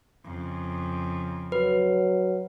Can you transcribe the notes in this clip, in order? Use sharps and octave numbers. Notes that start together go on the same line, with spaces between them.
F2 C#3
F#3 B4